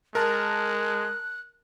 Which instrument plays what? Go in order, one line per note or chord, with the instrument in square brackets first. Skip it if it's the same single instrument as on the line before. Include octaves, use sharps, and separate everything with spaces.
[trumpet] G#3 [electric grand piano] A#4 A5 [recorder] F#6